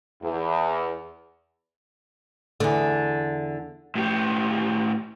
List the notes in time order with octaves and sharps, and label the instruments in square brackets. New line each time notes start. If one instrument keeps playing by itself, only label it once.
[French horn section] E2
[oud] E2 D3
[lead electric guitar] A2 G4